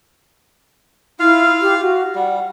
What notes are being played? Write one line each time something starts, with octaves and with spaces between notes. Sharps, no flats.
E4 F4 F5
G4
F#4
G3 F#5